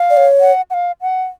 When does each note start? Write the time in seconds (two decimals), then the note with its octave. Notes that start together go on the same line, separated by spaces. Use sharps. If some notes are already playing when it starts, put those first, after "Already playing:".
Already playing: F5
0.10 D5
0.17 C#5
0.40 F#5
0.70 F#5
0.74 F5
1.01 F#5